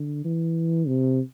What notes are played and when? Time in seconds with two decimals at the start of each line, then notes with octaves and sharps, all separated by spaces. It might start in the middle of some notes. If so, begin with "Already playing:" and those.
Already playing: D3
0.24 E3
0.87 C3